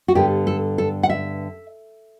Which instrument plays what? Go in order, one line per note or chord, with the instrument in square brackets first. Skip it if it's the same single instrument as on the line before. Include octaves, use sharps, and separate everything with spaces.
[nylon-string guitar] F#4
G2 D3 G3 B3 G4
A4
A4
F#5
E5